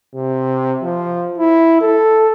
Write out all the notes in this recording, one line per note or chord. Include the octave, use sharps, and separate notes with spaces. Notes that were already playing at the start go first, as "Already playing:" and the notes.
C3
F3
E4
A4